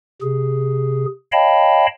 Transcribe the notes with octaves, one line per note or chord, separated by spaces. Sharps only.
C3 G#4
C#5 D#5 F5 G5 A5 B5